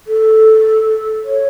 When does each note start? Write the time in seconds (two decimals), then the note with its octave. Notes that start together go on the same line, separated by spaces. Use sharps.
0.07 A4
1.24 C#5